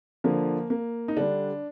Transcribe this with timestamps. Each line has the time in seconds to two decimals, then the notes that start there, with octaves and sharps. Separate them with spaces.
0.24 D3 F3 A#3
0.70 A#3
1.08 D#4
1.17 D3 G3 D4